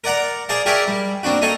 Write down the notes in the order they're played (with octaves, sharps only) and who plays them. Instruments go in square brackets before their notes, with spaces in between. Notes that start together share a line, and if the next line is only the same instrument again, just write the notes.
[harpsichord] A#4 D5 F#5 A#5
G#4 C5 D5 F5 A5
G4 G#4 A#4 C#5 D5 E5
G3
A#3 C4 D4 F#4
D#4 A4 C#5 D#5 F5